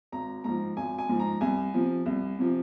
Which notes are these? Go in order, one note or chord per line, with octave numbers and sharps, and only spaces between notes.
G#1 A#5
G#2 F3 A#5
G#1 G#5
G#5
G#2 F3
A#5
C2 G#5
C3 F3
C2
C3 F3